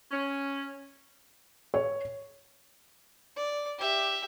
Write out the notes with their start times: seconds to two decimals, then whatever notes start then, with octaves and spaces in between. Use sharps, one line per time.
0.12 C#4
1.74 C#5
3.36 D5
3.79 G4 E5